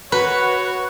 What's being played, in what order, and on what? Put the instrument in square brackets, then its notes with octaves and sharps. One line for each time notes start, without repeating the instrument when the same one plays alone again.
[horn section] F#4 C#5 [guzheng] B4